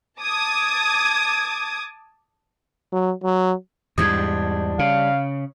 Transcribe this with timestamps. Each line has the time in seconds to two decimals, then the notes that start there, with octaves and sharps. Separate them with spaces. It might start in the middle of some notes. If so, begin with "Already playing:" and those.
0.21 A5 D6 D#6 G#6
2.92 F#3
3.24 F#3
3.98 E2 G#2 G3 D4 D#6 G#6
4.79 C#3 F5